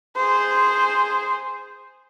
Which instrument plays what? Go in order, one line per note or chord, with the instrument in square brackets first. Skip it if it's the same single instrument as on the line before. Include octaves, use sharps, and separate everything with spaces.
[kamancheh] G#4 C5